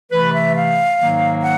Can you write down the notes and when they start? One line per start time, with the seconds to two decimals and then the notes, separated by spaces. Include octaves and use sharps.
0.11 C3 E3 A3 B4
0.33 E5
0.55 F5
0.99 G#2 D#3 F#3 A#3
1.42 F#5